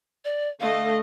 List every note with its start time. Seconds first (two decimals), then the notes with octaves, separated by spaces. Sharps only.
0.25 D5
0.60 D3 A3 D#5 F5